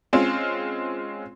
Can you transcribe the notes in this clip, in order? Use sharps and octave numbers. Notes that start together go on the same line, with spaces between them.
G#3 C4 C#4 F4 F5